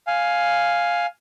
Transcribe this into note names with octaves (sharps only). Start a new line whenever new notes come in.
F5 G#5